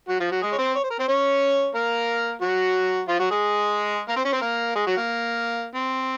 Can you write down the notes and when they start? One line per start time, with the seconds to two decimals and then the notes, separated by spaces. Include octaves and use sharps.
0.08 F#3 F#4
0.20 F3 F4
0.31 F#3 F#4
0.42 G#3 G#4
0.52 C#5
0.58 C4 C5
0.75 C#5
0.84 C5
0.90 A#4
0.99 C4 C5
1.08 C#4 C#5
1.75 A#3 A#4
2.42 F#3 F#4
3.08 F3 F4
3.19 F#3 F#4
3.31 G#3 G#4
4.08 A#3 A#4
4.16 C4 C5
4.25 C#4 C#5
4.33 C4 C5
4.41 A#3 A#4
4.75 G#3 G#4
4.87 F#3 F#4
4.97 A#3
5.75 C4